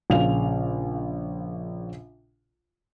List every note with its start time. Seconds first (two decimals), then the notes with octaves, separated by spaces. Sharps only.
0.10 A#1 C#3 F5 F7